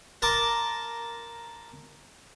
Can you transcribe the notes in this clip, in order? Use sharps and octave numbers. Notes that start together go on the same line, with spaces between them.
A#4 A5 C6 D6